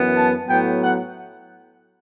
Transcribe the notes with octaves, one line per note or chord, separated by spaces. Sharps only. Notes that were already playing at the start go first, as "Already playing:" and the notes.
Already playing: F#2 E3 B3
A5
A2 F#3 B3 G5
F#5